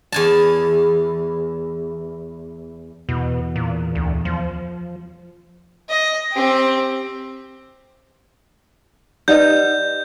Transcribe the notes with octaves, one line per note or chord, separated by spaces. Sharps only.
E2 G#5 A5
E2 B2
A#2
D2
F3
D#5
C4 G4
D#4 G4 B4 D5 D#5 F#5 G6